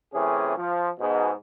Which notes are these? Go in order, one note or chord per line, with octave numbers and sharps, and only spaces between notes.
C3 E3 A3 C#4 G#4
F3
G#2 B2